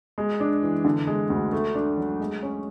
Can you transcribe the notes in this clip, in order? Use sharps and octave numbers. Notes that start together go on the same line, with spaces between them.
G#3
D4
E3
D3
G#3
D2
A3
D4
F#3
G#3
C#4